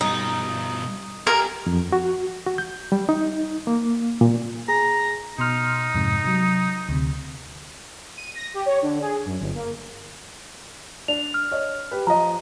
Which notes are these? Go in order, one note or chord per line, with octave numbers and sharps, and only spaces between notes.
G2 B2 D#4
G4 A#4 G#5
F2
F#4
F#4
G6
G3
D#4
A#3
A#2
G#4 A#5
B2 D#4 C6 F6
F2 G#2 C3
C3 F#3
D2 C3
D#7
A#6
G4
C#5
D3
G#4
F#2
G1
A#3
D4 F7
F6
C#5 D#5
G4 B4
F3 D#5 A#5